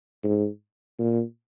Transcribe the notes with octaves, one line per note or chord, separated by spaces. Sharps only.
G#2
A#2